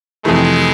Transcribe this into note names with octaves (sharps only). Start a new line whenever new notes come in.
F2 C3 E3 G#3 A3